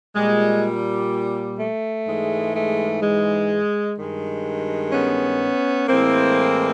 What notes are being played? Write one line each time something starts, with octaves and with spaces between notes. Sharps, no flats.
A#2 G3 G#3
A3
G#2 E3 G#3
A3
G#3
G2 D#3 G#3
B3 C#4
A2 E3 G#3 A#3 C4